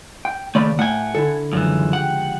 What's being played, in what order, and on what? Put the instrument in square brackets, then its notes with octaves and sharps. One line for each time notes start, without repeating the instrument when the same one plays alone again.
[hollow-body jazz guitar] G5
[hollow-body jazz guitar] D#2 D5 B5 [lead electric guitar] C#3 A3
[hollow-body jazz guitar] A2 [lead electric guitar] F#5 G#5
[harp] D3 [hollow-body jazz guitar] E4 A4
[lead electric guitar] F#2 E3 [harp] C#3 F3 G#3
[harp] G4 G5 [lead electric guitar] F#5